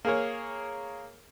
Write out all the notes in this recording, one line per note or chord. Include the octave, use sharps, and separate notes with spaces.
A#3 G#4 A#4 C#5